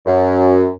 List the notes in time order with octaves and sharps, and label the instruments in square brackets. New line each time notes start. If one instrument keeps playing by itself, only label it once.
[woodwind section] F#2